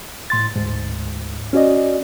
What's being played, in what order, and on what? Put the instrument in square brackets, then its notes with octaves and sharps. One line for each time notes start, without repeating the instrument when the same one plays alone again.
[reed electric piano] A2 C6 A6
D2 G#2
C#4 F#4 D5 D#5